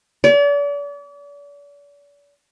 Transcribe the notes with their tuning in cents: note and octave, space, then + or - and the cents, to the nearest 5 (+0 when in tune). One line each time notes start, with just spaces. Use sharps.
D5 -40